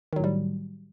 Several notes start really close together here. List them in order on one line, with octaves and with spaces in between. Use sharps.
D#3 F#3 A2 G3